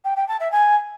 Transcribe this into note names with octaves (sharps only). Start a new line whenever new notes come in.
G5
G5
A5
E5
G#5